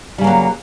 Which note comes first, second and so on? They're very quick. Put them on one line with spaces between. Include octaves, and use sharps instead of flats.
G3 C#3 A#3 F#3